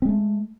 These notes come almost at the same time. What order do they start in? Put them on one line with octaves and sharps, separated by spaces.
C4 G#3 A3